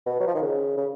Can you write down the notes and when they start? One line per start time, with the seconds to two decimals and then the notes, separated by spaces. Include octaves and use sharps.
0.06 B2
0.20 F#3
0.27 F3
0.35 D#3
0.42 C#3
0.77 C#3